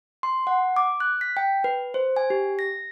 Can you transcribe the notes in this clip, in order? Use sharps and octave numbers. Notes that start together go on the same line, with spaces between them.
C6
F#5
D6
F#6
B6
G5
B4
C5
G#5
G4
A#6